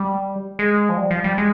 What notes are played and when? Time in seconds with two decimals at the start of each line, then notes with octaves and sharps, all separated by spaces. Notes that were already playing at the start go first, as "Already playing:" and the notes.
Already playing: G3
0.59 G#3
0.89 F3
0.98 G3
1.11 F3
1.24 G3
1.38 G#3